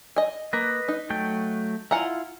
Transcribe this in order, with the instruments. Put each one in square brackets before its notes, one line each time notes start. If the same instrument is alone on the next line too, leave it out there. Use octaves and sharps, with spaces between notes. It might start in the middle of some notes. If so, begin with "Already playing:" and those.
[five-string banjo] D#5 G#5
[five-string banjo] A#3 [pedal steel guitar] B4 D#5
[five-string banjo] D#4
[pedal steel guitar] F#3 A3 G5
[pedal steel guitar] E4 F4 [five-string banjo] F#5 G#5 A#5